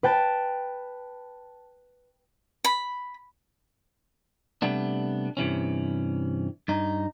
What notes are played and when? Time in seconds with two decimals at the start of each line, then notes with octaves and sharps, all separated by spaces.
0.03 B4 G5 A5
2.64 B5
4.62 C3 G3 A3 B3 D4
5.37 G2 C3 E3 C#4
6.68 G2 D#4